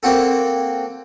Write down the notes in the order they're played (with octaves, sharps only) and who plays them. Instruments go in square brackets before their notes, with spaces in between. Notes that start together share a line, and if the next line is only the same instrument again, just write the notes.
[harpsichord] A#3 C4 F#4 A4